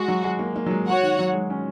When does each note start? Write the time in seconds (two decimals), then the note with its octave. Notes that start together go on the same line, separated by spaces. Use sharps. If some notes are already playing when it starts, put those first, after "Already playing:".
Already playing: G#3 F#4
0.08 F#3
0.24 G#3
0.39 A#3
0.56 A#3
0.66 F#3
0.71 G#3
0.86 F#4 C#5 F#5
1.03 D#3
1.19 F#3
1.34 G#3
1.50 C#4